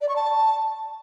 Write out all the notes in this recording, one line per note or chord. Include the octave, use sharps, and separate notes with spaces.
D5
C#6
A5